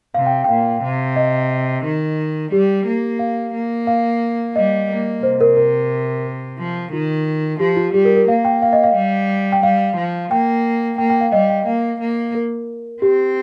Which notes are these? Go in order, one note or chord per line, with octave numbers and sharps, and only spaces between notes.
C3 F5
G5
G5
A#2 F5
C3
D#5
D#3
G3 G4
A#3
F5
A#3
F5
G3 D#5
A#3
C3 C5
A#4
A#4
F3
D#3 F4
F3 G4
F4
G3 G4
A#4
A#4
A#3 F5
G5
F5
D#5
F5
G3
G5
G3 F5
F3
A#3 G5
A#3 G5
G5
F5
G3 D#5
G5
A#3 F5
A#3
A#4
C4 G4